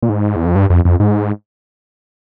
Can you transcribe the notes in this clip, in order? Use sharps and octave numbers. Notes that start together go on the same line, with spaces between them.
A#2
G#2
E2
F2
G2
F2
F2
G#2